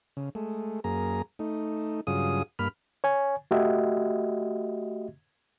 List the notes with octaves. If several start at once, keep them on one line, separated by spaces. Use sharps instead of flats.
C#3
G#3 A3
F#2 A#3 G#4 A#5
A3 D#4
G2 C#3 F#3 F4 G#4 D#6
G2 A#3 B5 F6
C#5 G#5
A3 F#4 G4 D#5 E5